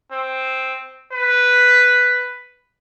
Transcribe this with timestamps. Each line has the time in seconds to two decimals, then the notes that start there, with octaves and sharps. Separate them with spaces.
0.12 C4
1.12 B4